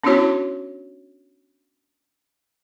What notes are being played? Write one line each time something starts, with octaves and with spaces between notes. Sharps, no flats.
B3 C#4 D4 E4 F#4 C#5